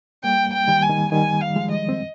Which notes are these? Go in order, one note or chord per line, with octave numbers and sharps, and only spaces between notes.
G3 A#3 G5
G5
D#3 G3
G#5
D#3 G3
D#3 G3 G#5
F5
F3 G#3
D#5
C4